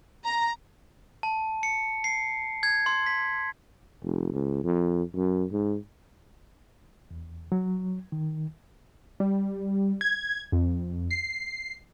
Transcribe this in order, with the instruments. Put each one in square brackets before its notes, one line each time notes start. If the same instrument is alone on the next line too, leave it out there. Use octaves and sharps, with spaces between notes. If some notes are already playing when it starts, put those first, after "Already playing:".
[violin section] A#5
[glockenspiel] A5
C#7
C7
G#6
C6
B6
[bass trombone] F1
C#2
F2
F#2
G#2
[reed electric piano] E2
F#3
D#3
[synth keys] G3
G#6
F2
C7